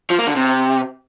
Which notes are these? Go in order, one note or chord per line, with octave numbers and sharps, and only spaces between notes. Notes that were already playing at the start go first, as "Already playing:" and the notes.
F3
A#3
D3
C3